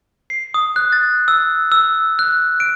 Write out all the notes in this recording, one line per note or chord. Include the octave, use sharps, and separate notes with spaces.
C7
D#6
F#6
A6
E6
E6
F#6
D7